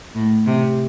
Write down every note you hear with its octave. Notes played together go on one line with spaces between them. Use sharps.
A2
C3